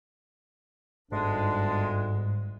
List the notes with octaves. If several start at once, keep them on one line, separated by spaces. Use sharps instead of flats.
G1 D2 G#2 G#3 D4